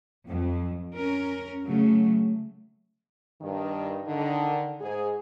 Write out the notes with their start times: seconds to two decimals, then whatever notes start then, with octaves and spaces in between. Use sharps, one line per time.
0.27 F2
0.93 C#4 A#4
1.64 C#3 F#3 A3
3.42 G2 D#3
4.07 D3 D#3
4.81 G#2 G#4